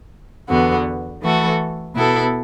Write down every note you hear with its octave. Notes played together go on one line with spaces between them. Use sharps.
E2 D3 B3 F#4
E3 A3 F#4 A4
B2 B3 E4 A4